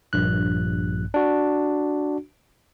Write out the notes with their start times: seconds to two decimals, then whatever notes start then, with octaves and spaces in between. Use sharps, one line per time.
0.13 A#1 G2 F#6
1.14 D4 F#4